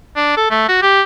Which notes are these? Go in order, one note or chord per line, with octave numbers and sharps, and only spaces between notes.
D4
A4
A3
F#4
G4